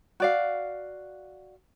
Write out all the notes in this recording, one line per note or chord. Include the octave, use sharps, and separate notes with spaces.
F#4 D5 F5